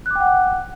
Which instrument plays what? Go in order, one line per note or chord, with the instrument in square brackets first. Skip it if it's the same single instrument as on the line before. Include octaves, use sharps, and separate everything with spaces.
[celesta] F#6
D6
G5
F#5